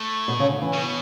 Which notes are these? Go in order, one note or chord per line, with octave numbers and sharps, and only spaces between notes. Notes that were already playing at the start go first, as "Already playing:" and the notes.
Already playing: A2
B2
C#3
D3
E3
B2